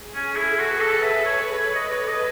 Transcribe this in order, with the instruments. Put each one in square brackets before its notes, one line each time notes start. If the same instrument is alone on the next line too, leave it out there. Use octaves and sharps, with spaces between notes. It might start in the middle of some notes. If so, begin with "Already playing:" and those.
Already playing: [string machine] G#4
[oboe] C#4
[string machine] A4
[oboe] E4
[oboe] F#4 [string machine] B4
[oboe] A4
E5
C#5
C#5
C#5
D#5
[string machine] A4 [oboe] C#5
[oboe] D#5